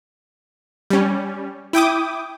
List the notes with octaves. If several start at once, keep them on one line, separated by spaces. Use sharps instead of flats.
G3 C#4
E4 G5 D6 D#6